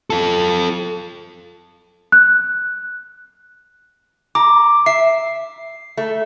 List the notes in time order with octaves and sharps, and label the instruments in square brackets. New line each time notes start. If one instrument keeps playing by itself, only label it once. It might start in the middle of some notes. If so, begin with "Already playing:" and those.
[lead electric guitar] F4 A4
[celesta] F#6
[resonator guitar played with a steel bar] A#5 [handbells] D6
[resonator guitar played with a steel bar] E5 [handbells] C7
[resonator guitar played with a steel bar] A3